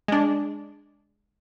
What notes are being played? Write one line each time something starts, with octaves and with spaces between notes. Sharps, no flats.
G#3 D4